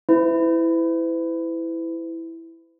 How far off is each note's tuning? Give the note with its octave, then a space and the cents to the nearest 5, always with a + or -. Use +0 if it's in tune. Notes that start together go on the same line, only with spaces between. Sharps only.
E4 +0 B4 +45